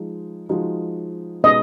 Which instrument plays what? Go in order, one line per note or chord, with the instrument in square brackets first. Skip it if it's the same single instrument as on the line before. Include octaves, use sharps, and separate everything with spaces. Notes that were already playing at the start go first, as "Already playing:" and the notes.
Already playing: [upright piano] F3 G#3 D#4
F3 G#3 D#4 F#4
[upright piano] B2 G#3 D#4 G#4 B4 [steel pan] D#5